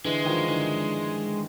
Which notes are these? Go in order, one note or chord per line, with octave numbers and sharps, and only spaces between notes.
D3 E3 G#3
E3
D#3 F3
D3 E3